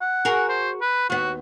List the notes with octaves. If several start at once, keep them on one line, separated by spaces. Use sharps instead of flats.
F#5
F#4 G#4 A#4
C5
B4
D#2 B3 F#4